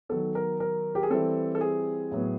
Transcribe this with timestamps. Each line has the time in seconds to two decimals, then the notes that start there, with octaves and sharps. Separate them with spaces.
0.09 D#3 F#3 B3 A4
0.35 A#4
0.60 A#4
0.95 G4
1.03 G#4
1.10 E3 G3 C4 A4
1.55 A4
1.61 G#4
2.11 A2 F#3 B3